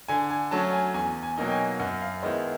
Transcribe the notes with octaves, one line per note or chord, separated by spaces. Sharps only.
D3 G#5
G#5
F#3 A3 C#4 A5
G#5
E2 G#5
G#5
B2 F#3 A#3 D#4
G5
G#5
F#2 F#5
F5
D#3 G#3 B3 E4 C5